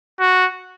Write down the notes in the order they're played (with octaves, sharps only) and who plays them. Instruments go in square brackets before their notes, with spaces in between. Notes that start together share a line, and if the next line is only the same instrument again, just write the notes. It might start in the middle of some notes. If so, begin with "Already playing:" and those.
[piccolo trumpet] F#4